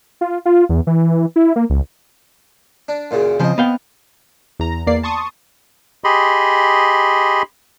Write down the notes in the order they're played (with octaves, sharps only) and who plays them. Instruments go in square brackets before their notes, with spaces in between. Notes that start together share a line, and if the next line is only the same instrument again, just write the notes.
[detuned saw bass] F4
F4
E2
E3
E4
A#3
C#2
[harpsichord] D4
F#2 A#2 C#3
[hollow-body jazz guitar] C#3 F3 [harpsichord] C4 D#5
[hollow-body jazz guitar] B3 F5 G5
[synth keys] E2 A#5
E2 A#3 D5 C7
A5 C6 C#6 D#6
[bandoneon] G4 G#4 D#5 B5 C6